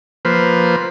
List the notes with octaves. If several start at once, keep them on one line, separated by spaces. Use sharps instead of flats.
F3 A#3 B4 C5